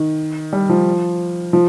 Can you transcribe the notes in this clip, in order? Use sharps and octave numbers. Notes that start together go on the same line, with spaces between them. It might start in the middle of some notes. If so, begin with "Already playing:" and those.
Already playing: D#3
G3
F3
F3